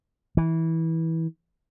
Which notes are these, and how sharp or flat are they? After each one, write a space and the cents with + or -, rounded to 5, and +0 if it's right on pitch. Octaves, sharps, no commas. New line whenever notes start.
E3 -20